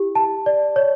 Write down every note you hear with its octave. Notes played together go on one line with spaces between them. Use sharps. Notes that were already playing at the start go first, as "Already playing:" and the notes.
Already playing: E4 G4
A5
D5
C#5